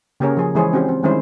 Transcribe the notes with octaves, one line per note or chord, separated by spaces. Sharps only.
C#3 A#3 G4 G#4 A#4 C#5
F3 G#4
E3 G#3 E4 G#4 C5 C#5
C4 C#4 F#4 G4 C5
C4
D#3 G3 G#3 C#4 E4 C5